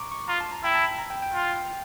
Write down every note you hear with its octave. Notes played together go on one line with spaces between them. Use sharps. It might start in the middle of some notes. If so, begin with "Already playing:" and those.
Already playing: A#5 C#6 D6
C#6
F4 A#5
A5
A#5
E4 G5
A5
A#5
G5
G5
F4